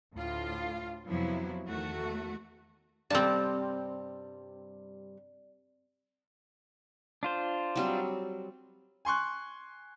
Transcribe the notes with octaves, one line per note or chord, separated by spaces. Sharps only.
D2 A2 F4
F2 C3 F3 F#3 B3 E4
E2 D#3 A3 F#4
G2 C3 G3 C4 D5 A5
D4 F4 C5
F#3 G3 C4
G#5 C6 C#6 F#6